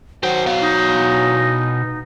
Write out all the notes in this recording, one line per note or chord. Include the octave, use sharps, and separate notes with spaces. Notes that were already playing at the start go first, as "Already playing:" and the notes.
D#3 F#3 C5 F#5
B2 F5
D#4